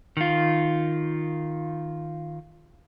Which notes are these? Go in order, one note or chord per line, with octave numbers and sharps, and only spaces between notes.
D#3 F4